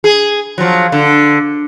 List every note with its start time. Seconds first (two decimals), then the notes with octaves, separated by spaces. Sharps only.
0.04 G#4
0.58 F3 F#3
0.92 D3